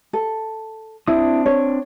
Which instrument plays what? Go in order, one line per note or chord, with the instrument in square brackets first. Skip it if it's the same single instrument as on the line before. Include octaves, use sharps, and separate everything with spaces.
[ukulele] A4
[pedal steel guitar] C4 D4 D#6 [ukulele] E4
[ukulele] C#5